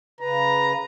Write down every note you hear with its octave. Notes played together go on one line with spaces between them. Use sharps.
C#3 B4 A#5